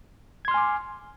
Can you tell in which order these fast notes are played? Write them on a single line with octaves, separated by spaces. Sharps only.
G#6 C6 F6 G#5 D6